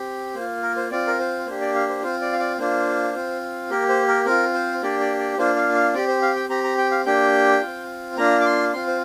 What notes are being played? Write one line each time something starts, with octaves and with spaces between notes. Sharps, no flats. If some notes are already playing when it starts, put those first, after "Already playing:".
Already playing: C4 G4
A#3 F4 C5
A#4
C5
C4 F4 D5
A#4
C5
A#3 D4 G4 C5
D5
F5
C5
C4 F4 C5
D5
F5
D5
A#3 D4 F4 C5
C4 F4
A#3 G4 A#4
C5
A#4
C4 F4 A#4
C5
A#3 D4 G4 D5
D5
D5
A#3 D4 F4 C5
F5
F5
C4 G4 D5
C5
F5
G5
C4 G4 A#5
A#5
G5
F5
A#3 D4 G4 G5
C4 F4
A#3 D4 F4 A#5
D6
C6
C4 F4 C6
C5